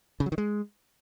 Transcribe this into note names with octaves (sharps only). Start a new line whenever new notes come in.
C#3
F#3
D#3
G#3